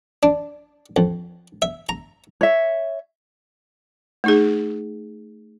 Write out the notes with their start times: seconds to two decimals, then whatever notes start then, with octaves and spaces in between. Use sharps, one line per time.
0.23 D4
0.96 F2
1.62 E5
1.89 A#5
2.41 C#5 E5
4.24 A3 D#4 G#4